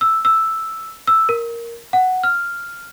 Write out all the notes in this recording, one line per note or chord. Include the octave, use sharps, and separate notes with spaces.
E6
E6
E6
A#4
F#5
F6